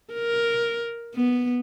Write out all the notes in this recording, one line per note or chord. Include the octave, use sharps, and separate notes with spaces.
A#4
B3